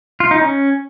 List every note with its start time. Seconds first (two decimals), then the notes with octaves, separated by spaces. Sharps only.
0.20 F4
0.31 D#4
0.42 C#4